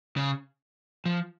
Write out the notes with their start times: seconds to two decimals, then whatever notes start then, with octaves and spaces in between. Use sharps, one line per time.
0.17 C#3
1.06 F3